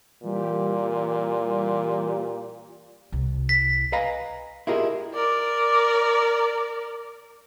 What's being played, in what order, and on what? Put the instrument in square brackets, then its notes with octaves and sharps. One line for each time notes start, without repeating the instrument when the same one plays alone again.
[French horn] A#2 [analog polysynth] E3 G3 G4
[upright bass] C2
[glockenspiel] B6
[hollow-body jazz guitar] B4 D#5 F5 G#5 A#5 B5
E4 F4 G4 G#4 A#4 D#5
[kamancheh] A#4 D5